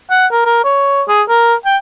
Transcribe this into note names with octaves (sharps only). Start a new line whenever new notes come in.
F#5
A#4
A#4
C#5
G#4
A#4
G5